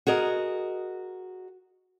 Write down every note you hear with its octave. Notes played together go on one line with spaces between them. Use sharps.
F#4 G#4 A#4 D#5